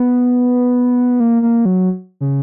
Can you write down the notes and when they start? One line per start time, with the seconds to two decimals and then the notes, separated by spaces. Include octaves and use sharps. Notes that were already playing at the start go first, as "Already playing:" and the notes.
Already playing: B3
1.20 A#3
1.42 A#3
1.65 F#3
2.21 C#3